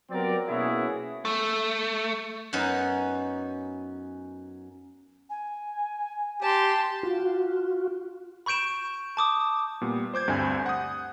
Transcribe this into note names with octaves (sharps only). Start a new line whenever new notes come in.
F#3 G3 B3 C4 A#4 D5
B2 A#3 C#4 E4 F#4 G#4
A3
F#2 B3 C#4 D#4
G#5
G4 A5 C6
F4 F#4
B5 C#6 G6 D7 E7
A5 D6 D#6
A#2 G3 B3
C5 D6 G6 G#6
D2 G2 C4 C5 G#5 G6
F#5 D#6